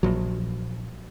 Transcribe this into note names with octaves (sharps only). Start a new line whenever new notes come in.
A#1 F#3